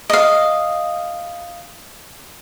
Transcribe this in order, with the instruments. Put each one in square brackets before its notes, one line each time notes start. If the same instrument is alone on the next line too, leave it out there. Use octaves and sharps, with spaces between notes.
[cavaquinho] D#5 F5